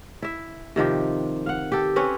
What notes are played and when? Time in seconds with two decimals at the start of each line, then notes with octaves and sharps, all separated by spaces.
0.22 E4 E5
0.76 C3 D#3 F3 G4
1.46 F5 F#5
1.72 G4 A4
1.96 C4 C#4 B4 C#5